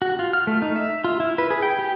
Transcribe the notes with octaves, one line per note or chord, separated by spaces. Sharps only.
F#4
F4
F6
A3
D#4
E5
F4
E4
B4
G#4
G5
G4